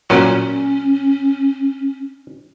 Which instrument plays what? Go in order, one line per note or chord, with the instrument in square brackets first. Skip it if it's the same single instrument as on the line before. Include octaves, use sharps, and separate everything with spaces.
[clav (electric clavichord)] A#2 F#3 [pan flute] C#4